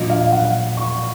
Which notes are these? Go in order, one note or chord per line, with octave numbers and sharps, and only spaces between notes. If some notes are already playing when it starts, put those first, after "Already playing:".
Already playing: A#2 F#3 A#3 D4 F4 D#5
F5
F#5
C#6